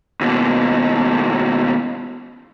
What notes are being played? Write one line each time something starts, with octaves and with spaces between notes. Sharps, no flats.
D#2 B2